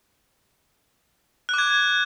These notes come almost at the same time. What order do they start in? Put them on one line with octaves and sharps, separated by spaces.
F#6 D6 G#6